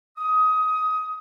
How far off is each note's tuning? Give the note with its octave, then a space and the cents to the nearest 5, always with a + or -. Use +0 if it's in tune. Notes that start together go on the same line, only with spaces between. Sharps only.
D#6 +20